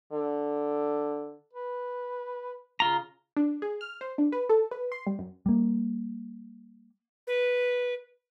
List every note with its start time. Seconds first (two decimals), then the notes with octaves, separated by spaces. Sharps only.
0.12 D3
1.53 B4
2.80 C#3 F4 A#5
3.37 D4
3.62 G#4
3.81 F6
4.01 C5
4.18 D4
4.32 B4
4.49 A4
4.71 B4
4.92 C6
5.07 G3
5.19 F#2
5.46 G3 A#3
7.27 B4